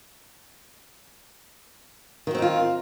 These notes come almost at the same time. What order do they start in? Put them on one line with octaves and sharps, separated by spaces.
D#3 F#4 C4 D#4 F4